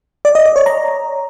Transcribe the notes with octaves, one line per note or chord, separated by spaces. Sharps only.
D5
D#5
D5
C#5
A#5